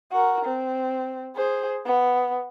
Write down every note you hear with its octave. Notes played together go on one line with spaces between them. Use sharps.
F#4 A#4
C4
G#4 C5
B3